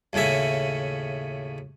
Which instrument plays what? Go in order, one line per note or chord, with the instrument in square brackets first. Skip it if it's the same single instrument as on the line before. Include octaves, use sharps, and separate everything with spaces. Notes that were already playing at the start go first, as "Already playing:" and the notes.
[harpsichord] D#2 A2 C#3 C#4 E5